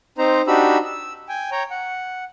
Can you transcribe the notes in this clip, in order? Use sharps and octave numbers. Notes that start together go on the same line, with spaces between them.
C4 D#4 C5 A#5
D4 D#4 F#4 G4 B5 E6
E6
G5 G#5
C#5 G5 A#5
F#5